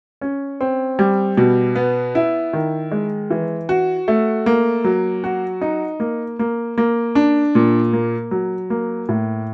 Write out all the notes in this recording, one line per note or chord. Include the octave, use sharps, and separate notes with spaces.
C#4
C4
G3
B2
B3
E4
D#3
G#3
E3
F#4
A3
A#3
F#3
F#4
D#4
A#3
A#3
A#3
D4
A#2
A#3
F#3
A#3
A2